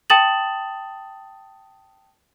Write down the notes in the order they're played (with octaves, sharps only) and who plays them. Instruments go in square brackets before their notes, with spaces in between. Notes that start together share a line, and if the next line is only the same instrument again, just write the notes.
[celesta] G5 A5 D#6 A6 E7 F#7